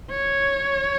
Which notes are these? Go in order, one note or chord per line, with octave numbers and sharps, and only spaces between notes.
C#5